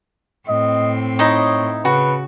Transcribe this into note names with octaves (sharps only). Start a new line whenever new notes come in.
A2 C4 D#5
D#4 E4 C#5 D#5
C#3 F#4 B4